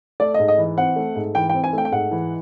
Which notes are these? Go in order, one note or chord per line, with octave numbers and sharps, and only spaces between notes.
A3 D5
G#2 D#5
D#5
E3
C4 F#5
A3
G#2
E3 G5
C4 G5
G#5
A3 G5
G5
G#2 F#5
E3